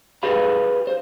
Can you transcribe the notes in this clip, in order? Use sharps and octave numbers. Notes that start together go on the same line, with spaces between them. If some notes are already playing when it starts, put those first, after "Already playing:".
G4 G#4 B4 F5 B5
C5